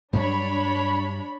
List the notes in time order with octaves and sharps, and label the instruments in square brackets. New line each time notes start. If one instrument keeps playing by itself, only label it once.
[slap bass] G2 F#3 G3 [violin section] D4 C#5 B5